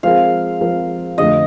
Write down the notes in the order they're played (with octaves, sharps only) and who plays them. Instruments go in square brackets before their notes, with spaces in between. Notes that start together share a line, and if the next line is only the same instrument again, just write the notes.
[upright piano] F3 G#3 C4 F4 A#4 [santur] F5
[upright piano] F3 G#3 C4 F4 A#4
[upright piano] F2 D3 F3 A3 C4 [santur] D#5